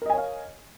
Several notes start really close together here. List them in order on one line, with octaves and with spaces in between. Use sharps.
A#4 D#5 G#5 C#5 F5